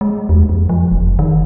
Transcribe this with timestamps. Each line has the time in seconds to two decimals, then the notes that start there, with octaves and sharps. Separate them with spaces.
0.01 G#3
0.29 E2
0.49 F2
0.69 F3
0.92 F#1
1.19 D#3